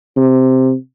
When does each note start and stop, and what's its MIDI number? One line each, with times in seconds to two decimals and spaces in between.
0.16 0.73 48